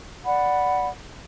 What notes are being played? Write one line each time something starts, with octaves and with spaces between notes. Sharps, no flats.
D5 F#5 B5